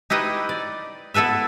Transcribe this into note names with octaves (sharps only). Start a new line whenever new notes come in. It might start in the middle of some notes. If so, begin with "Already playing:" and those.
D#4 E4 G4 B4 D#5
D5
B3 E4 A4 B4 E5